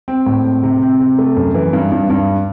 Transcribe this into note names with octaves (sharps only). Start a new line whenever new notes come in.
C4
A2
C4
C3
C4
C3
A3
F#2
E3
G2
G2
G2